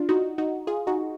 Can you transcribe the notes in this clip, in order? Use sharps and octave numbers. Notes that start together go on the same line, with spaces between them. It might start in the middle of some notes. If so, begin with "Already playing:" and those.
Already playing: D4 F4
D#4 F#4
D#4 F#4
F4 G#4
D#4 F#4